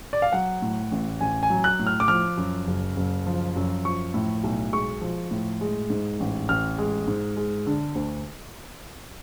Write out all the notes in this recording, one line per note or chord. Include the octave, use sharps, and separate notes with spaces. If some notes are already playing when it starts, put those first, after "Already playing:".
D5
F5
F#3 F#5
A2
A1
A1 G#5
G#5
F#3
F#6
A2
F6
D6
F3 F6
F#2
F#1
F#1
F3
F#2
F3 C#6
A2
B1
G#3 C#6
F3
A2
G#3
G#2
A1
A1 F6
G#3
G#2
G#3
D3
D2